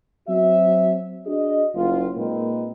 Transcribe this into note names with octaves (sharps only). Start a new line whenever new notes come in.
F#3 C4 F#4 E5
D4 F#4 G#4 D#5
F#1 F4
A#2 G#3 A#3 C4 D#4 B4